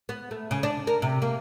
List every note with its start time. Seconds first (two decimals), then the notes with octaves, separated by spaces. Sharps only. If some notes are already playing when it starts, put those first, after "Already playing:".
0.09 B3
0.31 A3
0.51 C#3
0.63 D4
0.87 A#4
1.02 C3
1.22 A#3